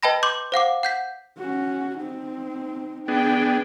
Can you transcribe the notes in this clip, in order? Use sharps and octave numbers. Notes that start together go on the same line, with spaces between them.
B4 D#5 G5 A5 B5 A#6
C6 D6 G6
C5 F5 F#5 D6
F#5 G6 B6
C#4 F#4
C4 D#4
B3 D4 G#4 G5